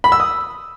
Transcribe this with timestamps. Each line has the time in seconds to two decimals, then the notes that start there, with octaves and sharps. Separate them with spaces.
0.04 B5
0.12 E6
0.20 D#6